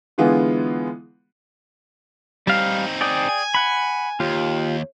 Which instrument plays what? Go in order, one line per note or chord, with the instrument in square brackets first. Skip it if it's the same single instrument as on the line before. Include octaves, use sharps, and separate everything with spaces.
[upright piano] D3 E3 G#3 B3 F4 G#4
[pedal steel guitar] G3 F5 [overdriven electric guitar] C4 D#4
[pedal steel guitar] G#4 D5 G5
[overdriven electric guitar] G#5
[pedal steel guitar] F#5 B5
[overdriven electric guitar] D#2 [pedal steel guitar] F4 G4